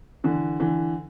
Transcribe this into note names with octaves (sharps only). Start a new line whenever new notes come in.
D3 E3
D3 E3